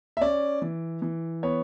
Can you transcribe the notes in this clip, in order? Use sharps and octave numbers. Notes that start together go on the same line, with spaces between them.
E5
C#4 D5
E3
E3
B3 C#5